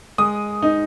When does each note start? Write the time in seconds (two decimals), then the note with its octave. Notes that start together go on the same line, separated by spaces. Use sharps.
0.18 G#3 D#6
0.62 D#4